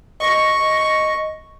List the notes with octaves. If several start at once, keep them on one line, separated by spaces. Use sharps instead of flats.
D#5 C#6